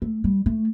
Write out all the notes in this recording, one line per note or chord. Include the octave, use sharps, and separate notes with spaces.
A3
G3
A3